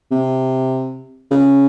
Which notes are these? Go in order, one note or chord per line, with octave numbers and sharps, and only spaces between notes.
C3
C#3